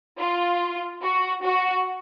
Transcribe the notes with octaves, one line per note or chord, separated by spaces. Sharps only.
F4
F#4
F#4